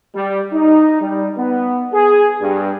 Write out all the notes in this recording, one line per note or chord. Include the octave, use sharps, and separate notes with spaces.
G3
D#4
G3
B3
G#4
G2